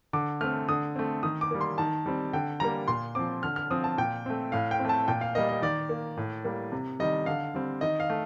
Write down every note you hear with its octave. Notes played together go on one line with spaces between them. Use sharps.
D3 D6
A3 C4 F6
D3 D#6
A3 C4
D#3 D#6
D6
G3 A#3
C6
D#3 A5
G3 C4
D3 G5
G3 A#3 A#5
A#2 C6
F3 C4 D6
D3 F6
F6
F3 C4 D#6
A5
A#2 G5
A3 C4
A2 F5
G5
C4
A3 A5
A#2 G5
F5
G3 A#3 D#5
D#5
D#3 D5
A#3
A2
G3 A#3
C3
D#3 G3 D#5
D3 F5
G3 C4
D#3 D#5
F5
A3